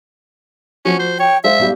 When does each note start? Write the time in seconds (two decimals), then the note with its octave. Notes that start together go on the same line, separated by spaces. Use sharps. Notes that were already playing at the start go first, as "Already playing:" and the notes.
0.85 F3 C#4 F#4
0.99 C5
1.19 C#5 G5
1.44 G#3 C5 E5 F5
1.59 B1 B2 G3